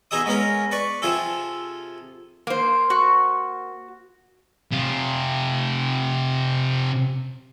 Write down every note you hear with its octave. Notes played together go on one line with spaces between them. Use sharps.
B2 D#4 G#4 E5 D#6
G#3 B3 C#4 A#4
B4 D5 C#6
C3 F3 F4 G#4 A4
A#3 C5
F#4
C3 F4